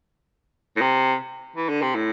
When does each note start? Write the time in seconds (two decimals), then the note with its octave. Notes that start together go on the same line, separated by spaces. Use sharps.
0.76 A2
0.81 C3
1.56 E3
1.69 D3
1.82 C3
1.95 A2